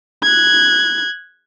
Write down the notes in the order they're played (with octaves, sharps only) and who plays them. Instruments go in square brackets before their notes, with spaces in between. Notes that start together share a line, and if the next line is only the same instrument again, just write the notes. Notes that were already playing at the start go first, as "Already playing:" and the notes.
[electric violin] F#6 G#6